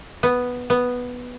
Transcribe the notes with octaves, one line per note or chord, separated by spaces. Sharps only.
B3
B3